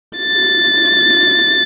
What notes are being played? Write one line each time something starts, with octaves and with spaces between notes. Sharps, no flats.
A6